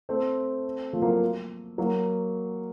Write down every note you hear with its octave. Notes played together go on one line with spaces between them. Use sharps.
A3 C4
F3 A3
F#3 A#3
F#3 A#3